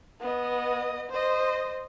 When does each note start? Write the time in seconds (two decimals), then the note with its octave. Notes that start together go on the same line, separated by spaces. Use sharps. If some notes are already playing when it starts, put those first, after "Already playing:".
0.20 B3 D#5
1.10 C5 D#5